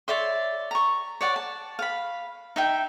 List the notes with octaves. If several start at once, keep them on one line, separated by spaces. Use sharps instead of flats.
C#5 D5 E5 C6
A#5 C#6
C#5 D5 F#5
A5
F5 B5
D#4 E5 G5